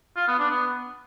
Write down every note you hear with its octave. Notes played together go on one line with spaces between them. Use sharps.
F4
B3
D4
B3